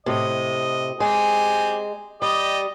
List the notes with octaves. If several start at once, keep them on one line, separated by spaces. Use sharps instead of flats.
A2 C3 D#5
G#3 C4 G4 G#5
G3 G4 D#5